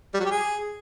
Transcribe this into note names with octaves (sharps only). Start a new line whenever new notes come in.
G3
F#3
G4
G#4